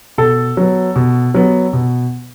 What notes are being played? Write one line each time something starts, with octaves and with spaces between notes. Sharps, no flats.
B2 A4
F#3 B3
B2
F#3 B3
B2